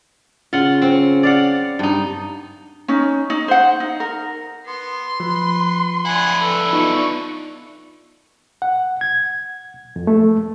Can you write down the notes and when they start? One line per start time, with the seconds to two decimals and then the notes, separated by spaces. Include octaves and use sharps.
0.53 C#3 F4 F#5
0.82 C4
1.23 D5 F5 F#5
1.79 G2 D#4
2.88 C#4 D#4
3.30 D#4
3.48 C5 F#5
3.80 D#4
4.00 A#4
4.66 B3 C6
5.20 F3 B4
6.05 D4 E4 F#5 G#5
6.41 A4 B4
6.73 B3 D#4 F4 C#6
8.62 F#5
9.01 G#6
9.96 F2
10.07 A3